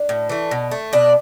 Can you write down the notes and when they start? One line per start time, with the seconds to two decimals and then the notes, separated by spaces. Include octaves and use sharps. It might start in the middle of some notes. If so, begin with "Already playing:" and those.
Already playing: D4
0.09 A2
0.29 E3 A3
0.51 B2
0.71 A3
0.93 B2 D4 D5